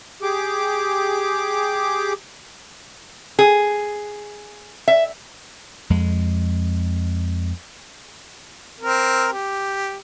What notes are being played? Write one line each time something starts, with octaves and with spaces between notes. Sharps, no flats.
G4 G#4 D6
G#4
E5
F2 G#3
C4 A#4
G4